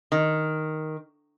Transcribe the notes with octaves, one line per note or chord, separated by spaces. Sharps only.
D#3